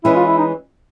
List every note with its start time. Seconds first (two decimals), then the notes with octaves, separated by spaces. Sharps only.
0.04 E3 G#3 C#4 E4
0.16 F4
0.26 E4
0.38 D#4